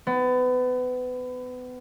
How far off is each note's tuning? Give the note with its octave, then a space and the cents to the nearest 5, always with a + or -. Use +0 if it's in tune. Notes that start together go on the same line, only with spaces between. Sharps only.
B3 +30